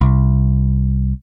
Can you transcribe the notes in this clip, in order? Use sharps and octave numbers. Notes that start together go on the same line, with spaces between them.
C2